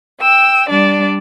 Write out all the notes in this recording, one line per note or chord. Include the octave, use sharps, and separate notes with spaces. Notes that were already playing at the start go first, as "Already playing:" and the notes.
G5 E6
G3 D4 D5